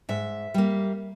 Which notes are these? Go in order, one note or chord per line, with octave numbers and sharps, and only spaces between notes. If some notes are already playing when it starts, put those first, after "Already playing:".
G#2 E5
G3 A#3